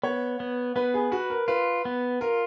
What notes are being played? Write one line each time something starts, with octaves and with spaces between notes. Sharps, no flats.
B3 C#5
B3
B3 B4
G#4
F#4 B4
A#4
F4 B4
B3
F4 A#4